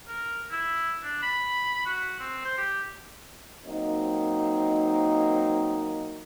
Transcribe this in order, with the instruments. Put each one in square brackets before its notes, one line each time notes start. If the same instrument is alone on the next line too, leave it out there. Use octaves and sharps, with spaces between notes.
[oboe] A#4
E4
D4
B5
F#4
C4
C5
G4
[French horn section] F#3 A#3 C4 D#4